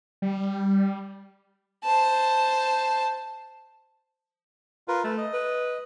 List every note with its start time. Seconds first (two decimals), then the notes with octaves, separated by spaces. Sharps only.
0.22 G3
1.84 C5 A5
4.88 F4 A#4 B4
5.04 A3 B4
5.18 D#5
5.33 B4